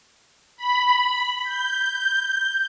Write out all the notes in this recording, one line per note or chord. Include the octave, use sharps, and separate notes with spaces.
B5
G6